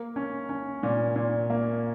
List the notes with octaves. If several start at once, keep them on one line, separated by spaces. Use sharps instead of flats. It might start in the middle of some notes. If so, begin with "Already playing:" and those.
Already playing: A#3
C#4
C#4
A#2
A#2
A#3